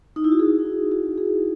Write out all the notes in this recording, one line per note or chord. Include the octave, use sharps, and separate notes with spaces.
D#4
E4
F#4
G#4
D#4
E4
F#4
G#4